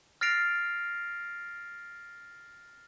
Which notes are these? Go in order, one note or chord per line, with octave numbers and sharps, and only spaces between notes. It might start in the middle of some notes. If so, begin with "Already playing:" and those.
F6 A6 A#6 C7 D7 F7